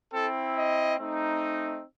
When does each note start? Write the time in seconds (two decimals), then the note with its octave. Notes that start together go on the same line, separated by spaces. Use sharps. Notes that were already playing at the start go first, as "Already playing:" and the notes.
0.12 C4 E4 A4
0.55 D#5
0.99 A3 C4 D#4